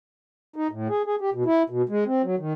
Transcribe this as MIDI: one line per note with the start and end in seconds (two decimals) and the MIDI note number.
0.56 0.67 63
0.71 0.88 45
0.89 1.02 68
1.06 1.15 68
1.21 1.30 67
1.33 1.43 47
1.46 1.63 64
1.70 1.82 47
1.89 2.04 56
2.06 2.22 60
2.24 2.35 54
2.39 2.53 51